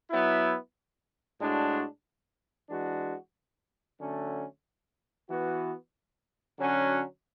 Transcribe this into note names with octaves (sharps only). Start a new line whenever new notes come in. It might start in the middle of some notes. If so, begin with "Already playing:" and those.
F#3 B3 E4
A2 G#3 D4 F#4
E3 G#3 D4 F#4
D3 F#3 A3 C#4
E3 B3 F#4
D3 F#3 C#4 F#4